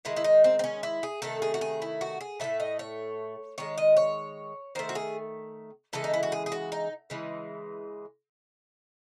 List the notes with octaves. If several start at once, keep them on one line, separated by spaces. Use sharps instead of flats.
D#3 G#3 E4
E4
D#4
C4
C4
C#4
E4
G#4
C3 D#3 A3 A4
G#4
F#4
G#4
E4
F#4
G#4
A2 F#3 A3 E5
D#5
C#5
D#3 G#3 C#5
D#5
C#5
D#3 A3 C5
F#4
G#4
C#3 E3 G#3 A4
D#4
E4
F#4
G#4
G#4
F#4
D#4
C#3 E3 G#3